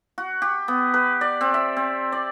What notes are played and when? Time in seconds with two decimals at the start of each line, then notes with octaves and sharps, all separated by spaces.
0.18 F#4
0.42 G4
0.68 B3
0.94 B4
1.21 D5
1.41 C4
1.54 E5
1.77 C4
2.12 D5